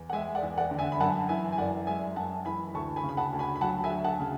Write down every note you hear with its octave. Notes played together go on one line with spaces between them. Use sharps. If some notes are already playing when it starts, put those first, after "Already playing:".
Already playing: E2
F#5
G#3 E5 G#5
D5 F#5
E2
D5 F#5
D3
E5 G#5
B5
F#2 F#5 A5
E3 E5 G#5
G#5
F#2 D5 F#5
G#3 E5 G#5
F#2 F#5 A5
E3 G#5 B5
D2 A5 C#6
G#5 B5
C#3
B5
F#5 A5
D2
G#5 B5
B5
F#3 F#5 A5
E5 G#5
D2
F#5 A5
C#3